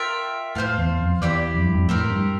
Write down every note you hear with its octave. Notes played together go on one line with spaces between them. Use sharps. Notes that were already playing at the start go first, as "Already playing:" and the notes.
Already playing: F4 A#4 E5 G5
A2 F4 C5 F5 A5
E2
F2
E2 E4 G4 D5
F2
G2
F2
A2 C4 G4 A#4
G2